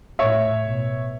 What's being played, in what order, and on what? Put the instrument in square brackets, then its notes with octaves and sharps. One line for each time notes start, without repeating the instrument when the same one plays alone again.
[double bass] A2 [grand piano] C#5 E5
[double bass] B2